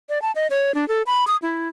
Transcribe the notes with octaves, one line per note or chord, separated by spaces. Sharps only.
D5
A5
D#5
C#5
D4
A4
B5
D#6
E4